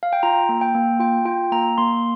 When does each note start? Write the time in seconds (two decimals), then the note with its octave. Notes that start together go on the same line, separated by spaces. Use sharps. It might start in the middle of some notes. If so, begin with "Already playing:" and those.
0.03 F5
0.13 G5
0.23 F4 A#5
0.49 A#3
0.61 G5
0.74 A#3
1.00 F4 G5
1.25 F4 G5
1.52 A#3 A#5
1.78 A#3 C6